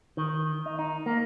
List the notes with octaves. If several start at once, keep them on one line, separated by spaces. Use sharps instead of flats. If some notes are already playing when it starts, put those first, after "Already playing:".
D#3
D#4
D#4
A#3